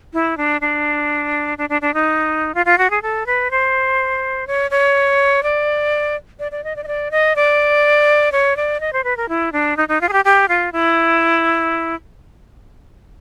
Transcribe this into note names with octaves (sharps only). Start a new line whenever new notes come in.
E4
D4
D4
D4
D4
D4
D#4
F4
F4
F#4
G#4
A4
B4
C5
C#5
C#5
D5
D5
D5
D#5
D5
D#5
D5
D#5
D5
C#5
D5
D#5
C5
B4
A#4
E4
D4
D#4
D#4
F4
G#4
G4
G4
F4
E4